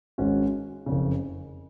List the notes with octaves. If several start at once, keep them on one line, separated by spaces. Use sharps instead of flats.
G#1 G#2 G#3 C#4 F#4
F#1 F2 C#3